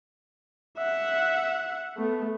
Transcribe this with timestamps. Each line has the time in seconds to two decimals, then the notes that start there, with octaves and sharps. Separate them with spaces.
0.78 E5 F#5
1.97 A3 B3